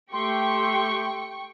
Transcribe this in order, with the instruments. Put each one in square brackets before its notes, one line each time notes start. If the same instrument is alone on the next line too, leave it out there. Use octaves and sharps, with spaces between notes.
[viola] A3 G4 [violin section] G5 C#6 [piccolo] C6